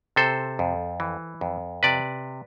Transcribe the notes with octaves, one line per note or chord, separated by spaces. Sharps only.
C3 A4 C5
F2
E3
F2
C3 B4 D5